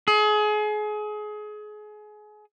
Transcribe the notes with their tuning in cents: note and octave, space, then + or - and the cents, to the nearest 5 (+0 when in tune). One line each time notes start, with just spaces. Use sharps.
G#4 +30